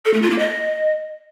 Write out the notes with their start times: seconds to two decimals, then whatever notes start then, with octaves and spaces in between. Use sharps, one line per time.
0.05 A4
0.13 A3
0.21 F4
0.30 A#3
0.38 D#5